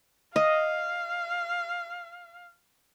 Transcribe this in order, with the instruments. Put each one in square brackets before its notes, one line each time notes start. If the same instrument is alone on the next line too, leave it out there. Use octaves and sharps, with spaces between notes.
[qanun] D#5 [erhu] F5